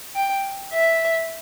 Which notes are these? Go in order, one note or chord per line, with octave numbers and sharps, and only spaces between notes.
G5
E5